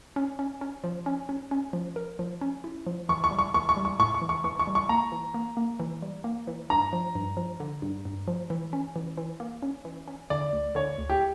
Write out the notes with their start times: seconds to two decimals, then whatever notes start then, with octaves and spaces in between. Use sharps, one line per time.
0.16 C#4
0.39 C#4
0.61 C#4
0.84 F3
1.06 C#4
1.29 C#4
1.51 C#4
1.73 F3
1.96 A#4
2.19 F3
2.41 C#4
2.64 E4
2.86 F3
3.09 E3 C#6
3.24 C#6
3.31 G3
3.39 C#6
3.54 E3 C#6
3.69 C#6
3.77 G3
3.85 C#6
3.99 A2 C#6
4.14 C#6
4.22 E3
4.29 C#6
4.44 E3 C#6
4.59 C#6
4.67 G3
4.75 C#6
4.89 A#3 A#5
5.12 E3
5.34 A#3
5.57 A#3
5.80 E3
6.02 G3
6.24 A#3
6.47 E3
6.70 G2 A#5
6.93 F3
7.15 G2
7.37 F3
7.60 D3
7.82 G2
8.05 G2
8.28 F3
8.50 E3
8.73 C#4
8.96 E3
9.17 E3
9.40 A#3
9.62 C#4
9.85 E3
10.08 C#4
10.30 D3 D5
10.53 D2
10.75 D3 C#5
10.98 D2
11.09 G4